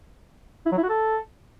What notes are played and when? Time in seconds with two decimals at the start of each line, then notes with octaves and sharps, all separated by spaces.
0.66 E4
0.72 F#3
0.78 E4
0.83 F#4
0.89 A4